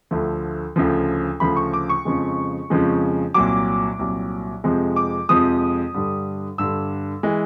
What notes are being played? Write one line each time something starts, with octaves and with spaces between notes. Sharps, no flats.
D2 D3 F3 A3
D2 C#3 F3
D2 C#3 F3 B5
C#6
D6
C#6
F2 C#3 F3 G#3
F2 C#3 F3 G#3
C2 A#2 F#3 D6
C2 A#2 F#3
F2 C3 F3 G#3
D6
F2 C3 F3 G#3 D#6
G2 D3 G3
G2 D3 G3 E6
E3 G#3